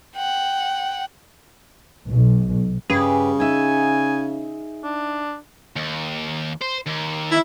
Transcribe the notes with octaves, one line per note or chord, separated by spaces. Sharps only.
F#5 G5
B1
G2 C#3 G4 G#4 B4
D#4 E5 G#5
D4
D#2
C5
D#2
E4